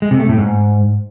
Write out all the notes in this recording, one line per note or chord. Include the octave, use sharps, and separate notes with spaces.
G#3
C3
A3
A2
G#2